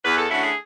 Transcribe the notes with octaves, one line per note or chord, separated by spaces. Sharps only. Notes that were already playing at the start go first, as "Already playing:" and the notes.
E2 B4
A4
D3 A3 C#4 E4 F#4
G#4